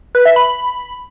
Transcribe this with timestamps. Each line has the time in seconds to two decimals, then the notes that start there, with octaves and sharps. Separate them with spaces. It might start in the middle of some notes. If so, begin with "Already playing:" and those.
0.15 B4
0.25 E5
0.36 B5